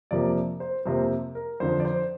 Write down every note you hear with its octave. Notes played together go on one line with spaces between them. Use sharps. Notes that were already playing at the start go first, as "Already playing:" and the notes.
F2 C3 F3 A#3 D5
C5
F2 C3 F3 A#3 C5
A#4
F2 D3 F3 C5
D5
C5